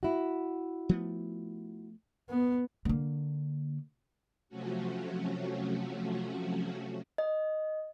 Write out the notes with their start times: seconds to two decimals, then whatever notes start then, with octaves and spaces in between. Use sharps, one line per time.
0.03 E4 F#4
0.89 F3 A3 B3
2.30 B3
2.85 D3 A#3
4.49 C3 F3 F#3 A3 C#4 F#4
7.18 D#5